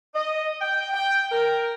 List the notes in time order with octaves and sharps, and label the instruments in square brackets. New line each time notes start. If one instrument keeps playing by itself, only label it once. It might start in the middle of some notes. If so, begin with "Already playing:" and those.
[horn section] D#5
G5
G5
A#4